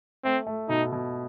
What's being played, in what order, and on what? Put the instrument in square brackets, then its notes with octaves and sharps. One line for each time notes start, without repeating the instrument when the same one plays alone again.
[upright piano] A3 [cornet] C4
[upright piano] A3
[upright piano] B2 [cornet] D#4
[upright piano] B2